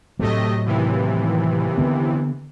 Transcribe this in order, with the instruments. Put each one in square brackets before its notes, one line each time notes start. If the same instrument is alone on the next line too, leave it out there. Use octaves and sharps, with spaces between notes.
[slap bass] A2 F#3 [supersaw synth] C3 A3 D#5
[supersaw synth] D#2 C3 E3
[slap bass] D3 B3